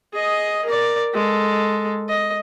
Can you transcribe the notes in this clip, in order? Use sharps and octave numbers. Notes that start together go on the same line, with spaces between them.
G#4 D#5
A#4 D5
G#3 A4
D#5